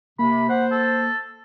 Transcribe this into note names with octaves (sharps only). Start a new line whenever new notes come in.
C3 A#3 B5
C5 F#5
A4